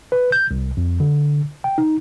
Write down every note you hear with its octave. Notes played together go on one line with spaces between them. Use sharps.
B4
G6
C2
F2
D3
G5
D#4